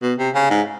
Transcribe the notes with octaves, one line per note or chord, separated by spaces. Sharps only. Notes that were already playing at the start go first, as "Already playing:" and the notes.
B2
C3
C#3
G#2